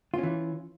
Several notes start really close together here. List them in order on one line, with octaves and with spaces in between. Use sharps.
F4 C#4 E3